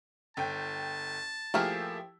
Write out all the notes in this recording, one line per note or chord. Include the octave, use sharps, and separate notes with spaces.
G1 G5 A5
F3 A3 A#3 E4 G4 G#4